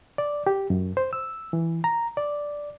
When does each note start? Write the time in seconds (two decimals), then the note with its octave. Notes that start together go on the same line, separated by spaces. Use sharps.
0.18 D5
0.47 G4
0.70 F#2
0.97 C5
1.13 E6
1.53 E3
1.84 A#5
2.17 D5